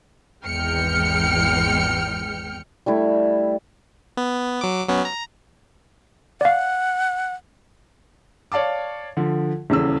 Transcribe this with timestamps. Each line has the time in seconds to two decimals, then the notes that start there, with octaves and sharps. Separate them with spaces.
0.46 G#1 E2 G#3 G5 F6 C#7
2.86 G3 A3 E4
4.17 B3
4.61 F#3 D6
4.88 F#3 B3 C#4
5.05 A#5
6.41 D5 F5 F#5
8.52 C#5 D5 F5 A5 D6
9.17 D3 F3
9.70 D#1 E2 C#3 E6